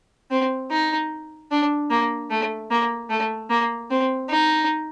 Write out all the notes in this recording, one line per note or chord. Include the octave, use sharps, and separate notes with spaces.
C4
D#4
D4
A#3
A3
A#3
A3
A#3
C4
D#4